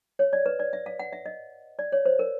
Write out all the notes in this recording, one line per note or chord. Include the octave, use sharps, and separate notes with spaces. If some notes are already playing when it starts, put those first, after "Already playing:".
C#5
D5
B4
D5
E5
F5
F#5
E5
D#5
D5
C#5
C5
A#4